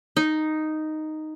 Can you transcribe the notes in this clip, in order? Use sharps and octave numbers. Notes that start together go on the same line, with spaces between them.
D#4